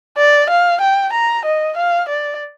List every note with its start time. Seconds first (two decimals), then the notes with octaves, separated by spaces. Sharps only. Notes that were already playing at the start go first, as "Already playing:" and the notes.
0.18 D5
0.50 F5
0.82 G5
1.13 A#5
1.45 D#5
1.77 F5
2.09 D5